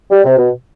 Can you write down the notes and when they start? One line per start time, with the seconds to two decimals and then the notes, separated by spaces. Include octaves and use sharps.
0.11 G3
0.24 C3
0.37 B2